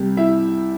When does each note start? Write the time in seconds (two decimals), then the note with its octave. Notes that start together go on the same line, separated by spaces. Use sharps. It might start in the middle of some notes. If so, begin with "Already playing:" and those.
Already playing: C2 C3 G3 G4
0.17 E4 E5